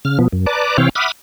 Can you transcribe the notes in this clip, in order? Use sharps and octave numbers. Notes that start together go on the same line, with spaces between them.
C#3 F6
B2 F3 B3
F#2
B4 D5 A5 A#5 D6
C3 E3 C4 C#5 F5 G5
E5 F#5 B5 D6 D#6 F6